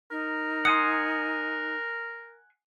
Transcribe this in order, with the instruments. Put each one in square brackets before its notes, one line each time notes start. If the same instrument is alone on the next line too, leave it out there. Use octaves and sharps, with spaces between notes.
[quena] D#4 [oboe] A#4
[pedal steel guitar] F#5 G#5 C6 [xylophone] D#6